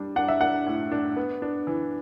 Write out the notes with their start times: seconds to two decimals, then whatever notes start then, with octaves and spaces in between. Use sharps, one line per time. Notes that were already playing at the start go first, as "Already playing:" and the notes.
Already playing: G3 D4
0.16 D4 F#5
0.28 E5
0.41 D4 F#5
0.66 A2
0.92 D4
1.16 B3
1.42 D4
1.67 E3